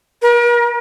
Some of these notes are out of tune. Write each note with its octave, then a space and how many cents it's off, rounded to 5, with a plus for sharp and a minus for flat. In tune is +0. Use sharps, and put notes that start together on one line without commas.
A#4 +40